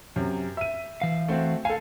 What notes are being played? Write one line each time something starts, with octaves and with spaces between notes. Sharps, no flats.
F#2 C3
E5 D#7
E3 F5
A3 C4 F#4
A4 F5 G#5